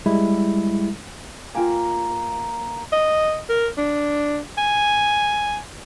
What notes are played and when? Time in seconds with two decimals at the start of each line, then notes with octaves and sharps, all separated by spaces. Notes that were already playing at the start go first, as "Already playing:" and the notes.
0.06 G3 G#3 E4
1.55 A#3 F4 G5 G#5
2.92 D#5
3.49 A#4
3.78 D4
4.58 G#5